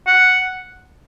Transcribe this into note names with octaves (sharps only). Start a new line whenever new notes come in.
F#5